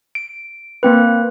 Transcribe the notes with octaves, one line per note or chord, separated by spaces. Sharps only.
D7
A#3 C4 B4